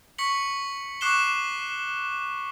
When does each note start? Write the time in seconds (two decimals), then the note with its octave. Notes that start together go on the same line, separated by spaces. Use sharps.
0.18 C#6 B6 C#7 F#7
1.01 C#6 D6 F#6 C7 E7 G7